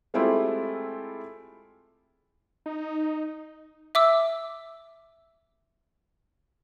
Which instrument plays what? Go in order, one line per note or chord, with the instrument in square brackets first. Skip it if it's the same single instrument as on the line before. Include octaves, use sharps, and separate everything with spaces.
[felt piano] G#3 A3 C4 E4 F4 G4
[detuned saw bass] D#4
[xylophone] E5 D6 E6